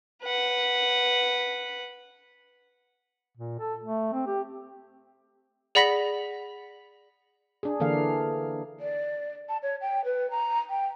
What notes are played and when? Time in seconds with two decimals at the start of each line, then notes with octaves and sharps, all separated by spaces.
0.24 B4 F#5
3.37 A#2
3.60 A4
3.84 A3
4.13 C4
4.27 G4
5.75 G#4 D5 F#5 B5 A#6 B6
7.63 D4 G#4
7.80 D3 E3 A#3 D4 F5
8.80 D5
9.49 A5
9.63 C#5
9.81 G5
10.05 B4
10.31 A#5
10.70 G5